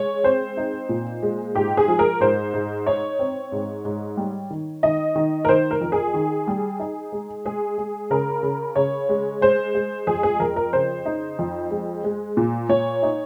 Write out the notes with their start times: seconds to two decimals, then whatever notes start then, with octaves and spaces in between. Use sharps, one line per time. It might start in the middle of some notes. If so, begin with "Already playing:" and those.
Already playing: G#3 C#5
0.24 C4 C5
0.57 D#4
0.89 A#2
1.23 G#3
1.55 G#2 G4
1.77 G#4
1.88 F3
1.99 A#4
2.20 G#2 C5
2.54 G#2
2.87 D#4 C#5
3.19 C4
3.52 G#2
3.85 G#2
4.17 G3
4.50 D#3
4.83 D#3 D#5
5.16 D#3
5.45 A#4
5.49 D#3 C5
5.71 A#4
5.81 F2
5.92 G#4
6.14 D#3
6.47 G3
6.80 D#4
7.12 G#3
7.45 G#3 G#4
7.78 G#3
8.10 C#3 A#4
8.43 C#3
8.76 C#3 C#5
9.09 G#3
9.41 G#3 C5
9.75 G#3
10.07 F2 G#4
10.23 G#4
10.40 F2 A#4
10.56 A#4
10.73 C#3 C5
11.06 D#4
11.39 F2
11.71 G#3
12.04 G#3
12.37 A#2
12.69 A#2 C#5
13.03 D#4